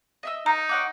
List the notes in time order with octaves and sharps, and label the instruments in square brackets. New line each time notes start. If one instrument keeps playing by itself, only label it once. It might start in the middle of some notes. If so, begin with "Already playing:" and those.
[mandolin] D#5 E5 E6
[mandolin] A#3 [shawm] D#4 [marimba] A#5
[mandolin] C#5 F#5 D6